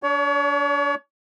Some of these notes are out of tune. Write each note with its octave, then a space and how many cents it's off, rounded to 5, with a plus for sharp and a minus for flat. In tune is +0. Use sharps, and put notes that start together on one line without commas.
D4 -30 C#5 +35